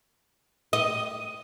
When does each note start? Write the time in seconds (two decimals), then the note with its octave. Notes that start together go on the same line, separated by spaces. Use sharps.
0.73 D#5